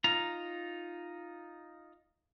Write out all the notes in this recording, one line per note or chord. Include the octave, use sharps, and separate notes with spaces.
D#4 F4 A#5